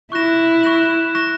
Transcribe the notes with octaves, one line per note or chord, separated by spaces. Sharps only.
E4 C#6 F#6 A#6 E7
C#6 F#6 A#6 E7
C#6 F#6 A#6 E7